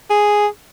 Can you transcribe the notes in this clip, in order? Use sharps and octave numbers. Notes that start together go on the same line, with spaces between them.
G#4